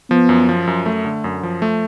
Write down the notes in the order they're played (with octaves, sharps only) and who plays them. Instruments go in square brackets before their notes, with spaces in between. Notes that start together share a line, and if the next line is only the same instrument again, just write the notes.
[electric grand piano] F3 [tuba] B3
[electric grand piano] F#2
F3
F#2
A3
D3
F#2
F3
A3